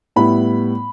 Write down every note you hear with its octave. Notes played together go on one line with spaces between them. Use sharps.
A2 G3 B3 E4 B5